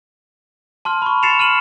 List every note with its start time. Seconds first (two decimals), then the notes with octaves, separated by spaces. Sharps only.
0.85 A5 C6 F6
1.02 B5 C#6
1.23 A6 C7 C#7 E7 F7
1.39 F6 D#7 F#7